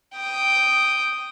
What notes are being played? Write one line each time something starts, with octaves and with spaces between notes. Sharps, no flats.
G5 D#6